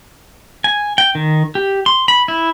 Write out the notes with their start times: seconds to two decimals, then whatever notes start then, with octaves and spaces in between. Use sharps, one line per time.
0.64 G#5
0.98 G5
1.15 D#3
1.55 G4
1.86 C6
2.08 B5
2.28 E4